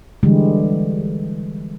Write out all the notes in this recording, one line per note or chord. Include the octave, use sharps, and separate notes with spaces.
D3 E3 G3 G#3